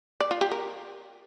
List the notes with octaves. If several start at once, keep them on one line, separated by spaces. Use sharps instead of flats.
D5
F4
G4
A#4